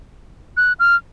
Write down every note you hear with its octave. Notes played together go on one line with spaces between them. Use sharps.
F#6
F6